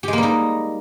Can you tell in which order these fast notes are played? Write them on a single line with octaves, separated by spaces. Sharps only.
G4 G#3 A#3 G3 D#4